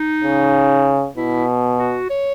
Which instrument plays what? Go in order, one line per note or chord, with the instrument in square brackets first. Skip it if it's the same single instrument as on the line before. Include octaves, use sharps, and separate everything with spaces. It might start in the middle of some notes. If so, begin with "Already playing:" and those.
Already playing: [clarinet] D#4
[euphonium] C#3
[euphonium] B2 [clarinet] E4
[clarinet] F#4
C#5